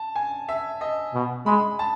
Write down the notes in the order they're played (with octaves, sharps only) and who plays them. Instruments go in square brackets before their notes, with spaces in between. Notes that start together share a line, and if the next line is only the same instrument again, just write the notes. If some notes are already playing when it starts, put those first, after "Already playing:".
Already playing: [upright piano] A5
G#5
E5
D#5
[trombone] B2
[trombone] G#3 [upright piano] B5
[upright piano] A5